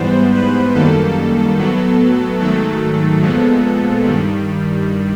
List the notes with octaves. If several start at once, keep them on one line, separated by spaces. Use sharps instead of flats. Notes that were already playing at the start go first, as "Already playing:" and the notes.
Already playing: G#2 E3 G3 B3 C5
B4
F#2 D#3 G3 A#3 A4
A2 F#3 B3
G#2 D#3 F#3 A3 A4
A#2 F3 G#3 B3
G2 D#3 G3